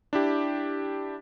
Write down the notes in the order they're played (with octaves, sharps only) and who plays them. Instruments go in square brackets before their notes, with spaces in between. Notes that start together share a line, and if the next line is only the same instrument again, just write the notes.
[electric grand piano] D4 E4 G4